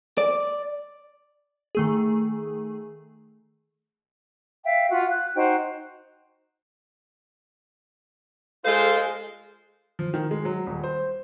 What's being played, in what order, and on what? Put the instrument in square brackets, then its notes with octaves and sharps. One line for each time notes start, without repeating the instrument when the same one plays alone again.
[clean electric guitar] D5
[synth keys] D#3 A3 G#4
[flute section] E5 F5 G5
F4 F#4
F#6
D#4 F#4 C5 G5
[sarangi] G#3 [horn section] F4 C5 [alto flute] A4 [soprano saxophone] F5
[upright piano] F3
D#3
G#3
F#3
D#1
C5